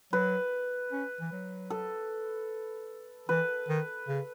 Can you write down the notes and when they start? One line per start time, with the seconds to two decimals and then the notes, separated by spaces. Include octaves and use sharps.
0.12 F#3 B4
0.92 C#4
1.20 E3
1.32 F#3
1.70 A4
3.29 E3 B4
3.68 D#3
4.08 C#3